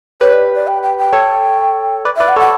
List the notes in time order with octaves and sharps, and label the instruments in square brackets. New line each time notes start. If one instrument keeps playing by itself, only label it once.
[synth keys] G4 B4 [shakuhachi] C#5
[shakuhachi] D5
D5
G5
G5
G5
[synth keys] A4 C#5
B4 D5
[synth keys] B4 D5 [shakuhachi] E5
[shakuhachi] F#5
[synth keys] A4 C#5
[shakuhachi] F#5